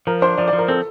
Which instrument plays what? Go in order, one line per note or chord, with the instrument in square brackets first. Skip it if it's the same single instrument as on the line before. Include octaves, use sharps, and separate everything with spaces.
[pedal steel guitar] F3 [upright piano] A#4
[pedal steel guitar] D4 [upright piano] C5
[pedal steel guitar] F3 [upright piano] D5
[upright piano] D5
[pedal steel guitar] F3
[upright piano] A#4
[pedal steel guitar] C4 [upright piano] A4